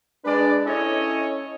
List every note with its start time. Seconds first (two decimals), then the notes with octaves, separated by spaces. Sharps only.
0.24 G#3 D4 B4 D5
0.65 C#4 E4 A4 C#5 D#5